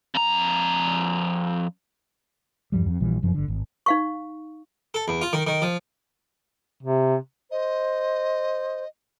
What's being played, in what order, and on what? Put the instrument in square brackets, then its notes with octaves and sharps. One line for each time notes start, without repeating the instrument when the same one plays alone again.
[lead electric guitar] F2 A#5
[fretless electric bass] E2 G2 F3 G3
F2
A#1 A#2 E3 G3
F1 F#2 F3
G1 D3
G#1
[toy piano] D#4 F5 C#6
[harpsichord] A4
E2
F4
D#3
D#3
F3
[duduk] C3
[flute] C5 [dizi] D#5